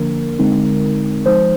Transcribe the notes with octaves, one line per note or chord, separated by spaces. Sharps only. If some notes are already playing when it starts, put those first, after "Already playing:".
Already playing: D3 F3 A#3 D4 A#4
D3 G#3 C4 D#4
F3 G#3 D#4 C5